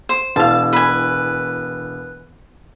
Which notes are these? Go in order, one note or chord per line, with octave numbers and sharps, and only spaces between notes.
C5
E1 F5 A5
B4 G#5